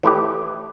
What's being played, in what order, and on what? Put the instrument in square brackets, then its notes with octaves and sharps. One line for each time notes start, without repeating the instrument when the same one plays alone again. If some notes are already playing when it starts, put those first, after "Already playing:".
[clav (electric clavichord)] E3 A3 E4 G4